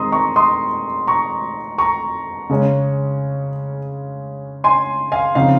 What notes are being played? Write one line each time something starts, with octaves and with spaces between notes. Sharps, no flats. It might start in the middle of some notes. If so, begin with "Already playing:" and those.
Already playing: D#3 G#3 C4 D#4 A#5 C6 D#6
A#5 C#6
C6 D#6
A#5 C#6
A#5 C#6
C#3 G#3 C#4
G#5 C6
F5 G#5
C#3 F3 C4 D#4 F5